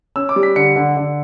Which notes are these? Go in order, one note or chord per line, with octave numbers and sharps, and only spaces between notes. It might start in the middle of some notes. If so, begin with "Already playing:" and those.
C#4 E6
D6
G3
B6
D3 C#7
D3
D3